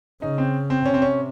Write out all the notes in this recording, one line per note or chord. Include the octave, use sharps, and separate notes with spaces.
C#3 D#4
C4
C4
C3 C#4
C4
C#4